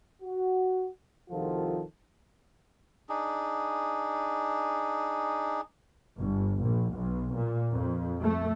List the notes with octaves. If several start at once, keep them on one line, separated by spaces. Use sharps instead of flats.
F#4
C2 D#3 F3 F4 F#4 A4
D4 D#4 G#4
G1
A#1
B1
A#2
F2
A3